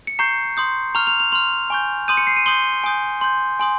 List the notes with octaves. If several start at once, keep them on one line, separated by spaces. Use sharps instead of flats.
C#7
A#5 C#6 G6 C7
C6 D#6 G6
A#5 C#6 F6 F7
F7
F7
C6 F6 F7
G#5 C#6 G6
C6 D#6 G6 D#7
C#7
C7
D#7
C6 D#6 G6 G7
G#5 D#6 G6
C6 G6
G#5 C6 D#6